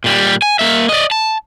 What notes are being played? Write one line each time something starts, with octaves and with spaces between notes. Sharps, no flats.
A#2 G3
G#5
A#3 E5
D5 D#5
A5